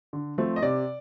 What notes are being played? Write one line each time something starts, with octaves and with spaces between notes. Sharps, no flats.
D3
F3 A3 C4
D#5
C3 D5